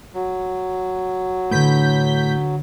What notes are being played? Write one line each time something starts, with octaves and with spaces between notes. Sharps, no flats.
F#3
A2 D3 B4 C#5 G6 B6